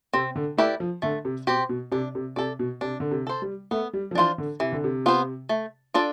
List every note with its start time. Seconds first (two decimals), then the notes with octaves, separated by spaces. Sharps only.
0.13 C3 C4
0.36 D3
0.57 A3 E4 G4 B4 D5
0.80 F3
1.02 D3 A3
1.25 C3
1.47 B2 C4 G4 C5
1.69 B2
1.92 C3 D4
2.15 C3
2.36 C3 A4 D5
2.59 B2
2.81 C3 D4
3.00 D3
3.11 C3
3.27 A4 C5
3.42 G3
3.71 A3 B3
3.93 G3
4.11 F3
4.15 E3 D4 F4 C5
4.38 D3
4.60 C3 E3
4.72 D3
4.84 C3
5.06 B3 F4 C5
5.49 A3
5.94 D4 F4 A4 D5